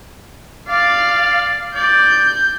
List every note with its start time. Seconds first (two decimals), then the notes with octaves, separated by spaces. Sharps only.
0.68 D5 F5
1.76 D5 G6